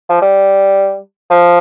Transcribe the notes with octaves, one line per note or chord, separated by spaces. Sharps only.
F3
G3
F3